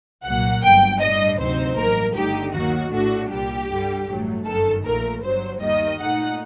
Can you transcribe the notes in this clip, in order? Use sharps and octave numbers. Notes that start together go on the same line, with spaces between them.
C2 A#2 F#3 A#3 F#5
G1 G2 F#3 G5
A2 G3 D4 D#5
D2 C3 F#3 C4 D#4 C5
A1 G2 F#3 A#3 A#4
G1 G2 D3 A3 D#4 G4
D#2 D#3 F#3 A#3 F#4
A#1 A2 A3 D4 F#4
C2 A#2 G3 G4
G2 D3 G3
A1 G2 F#3 A3
G1 F#2 D#3 A4
A#1 A#2 A3 A#4
G1 G2 F#3 C5
D#2 D#3 G3 D#5
A#2 A3 D#4 F#5